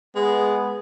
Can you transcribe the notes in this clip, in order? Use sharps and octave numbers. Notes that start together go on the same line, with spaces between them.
G#3 B3